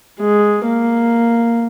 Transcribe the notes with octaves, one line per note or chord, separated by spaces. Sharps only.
G#3
A#3